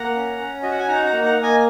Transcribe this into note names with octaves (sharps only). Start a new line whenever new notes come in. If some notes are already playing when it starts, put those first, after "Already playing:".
Already playing: A#3 F#5 A#5
C#4
C#4
F#4 D#5
F#5
G#5
D#4 F#5 A#5
F#5 A#5
A#3
F#5 A#5
A#3
D#5 G#5